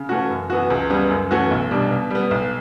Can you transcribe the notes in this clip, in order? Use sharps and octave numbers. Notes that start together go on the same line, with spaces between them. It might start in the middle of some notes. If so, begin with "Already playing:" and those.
Already playing: C#3
E3 A3 C#4 F#4
F#2
E3 B3 F#4
C#2
C#3 G3 B3
F#2
E3 A3 C#4 F#4
B1
B2 G3 D4
B2
G3 B3
B1